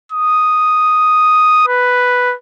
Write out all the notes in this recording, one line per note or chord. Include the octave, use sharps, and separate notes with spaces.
D#6
B4